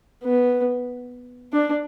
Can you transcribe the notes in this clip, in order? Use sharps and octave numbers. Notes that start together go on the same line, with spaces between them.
B3
D4